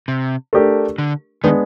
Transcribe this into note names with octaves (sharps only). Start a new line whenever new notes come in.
C3
A3 D4 G4 A#4
D3
D#3 G#3 B3 D4